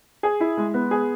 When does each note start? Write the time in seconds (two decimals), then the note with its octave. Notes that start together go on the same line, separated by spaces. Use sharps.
0.23 G#4
0.40 E4
0.57 G#3
0.74 B3
0.91 G#4